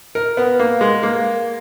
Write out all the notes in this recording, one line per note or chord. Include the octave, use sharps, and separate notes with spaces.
A#4
B3
A#3
G#3
A#3